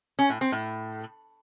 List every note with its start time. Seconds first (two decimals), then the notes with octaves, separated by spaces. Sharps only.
0.19 C#4
0.30 A2
0.41 C4
0.52 A2